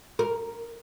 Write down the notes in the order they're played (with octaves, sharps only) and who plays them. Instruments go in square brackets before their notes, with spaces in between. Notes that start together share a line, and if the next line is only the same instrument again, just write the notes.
[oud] A#4